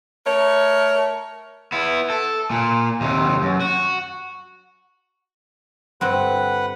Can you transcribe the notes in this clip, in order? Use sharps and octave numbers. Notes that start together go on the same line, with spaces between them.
A3 A#4 C#5
B3 E4
A4
A#2
D#2 C3
F#2
F#4
G2 D3 C4 B4 F#5